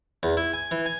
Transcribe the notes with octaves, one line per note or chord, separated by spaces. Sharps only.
E2
E4
G#5
E3
G#5